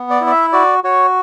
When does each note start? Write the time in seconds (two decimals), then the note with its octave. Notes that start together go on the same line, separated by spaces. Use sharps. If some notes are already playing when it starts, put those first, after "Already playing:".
Already playing: B3
0.10 D5
0.21 E4
0.27 D5
0.32 E5
0.53 F#4 D5
0.84 F#4 C#5